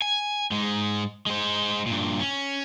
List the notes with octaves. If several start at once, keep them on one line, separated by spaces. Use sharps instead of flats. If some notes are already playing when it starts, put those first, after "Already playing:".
G#5
G#2 G#3
G#3 C5
G2 A#2
C#4